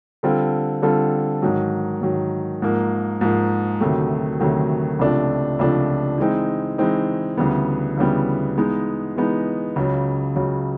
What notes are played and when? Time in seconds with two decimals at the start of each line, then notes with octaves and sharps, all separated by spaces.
0.23 D3 G3 C4 F4 A4
0.82 D3 G3 C4 F4 A4
1.42 G#2 D#3 F#3
2.01 G#2 D#3 F#3
2.62 G#2 F3 A#3
3.21 G#2 F3 A#3
3.81 D2 C3 D#3 F#3 A3
4.40 D2 C3 D#3 F#3 A3
4.99 C#2 C3 F3 A3 D4
5.59 C#2 C3 F3 A3 D4
6.18 E3 G#3 C4 D#4
6.78 E3 G#3 C4 D#4
7.37 D2 C#3 E3 G3 B3
7.97 D2 C#3 E3 G3 B3
8.57 E3 G#3 B3 D#4
9.16 E3 G#3 B3 D#4
9.76 C#2 C#3 F#3
10.36 C#2 C#3 F#3